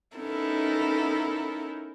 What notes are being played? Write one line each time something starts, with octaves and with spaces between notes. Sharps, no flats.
B3 C#4 D#4 E4 A4 A#4